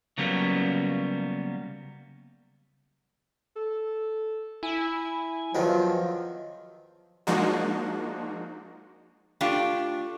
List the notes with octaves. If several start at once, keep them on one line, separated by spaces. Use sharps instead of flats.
C#3 F#3 G3 A#3 B3 C#4
A4
E4 G#5
E2 D#3 F3 F#3
F3 G#3 A#3 D4 D#4 F#4
A3 D4 F4 G4